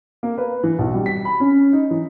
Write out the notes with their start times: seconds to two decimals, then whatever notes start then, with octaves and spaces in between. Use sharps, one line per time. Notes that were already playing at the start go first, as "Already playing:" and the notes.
0.23 A#3
0.38 B4
0.63 E3
0.79 B1
0.94 G3
1.06 B6
1.25 B5
1.40 C#4
1.73 D#4
1.91 E3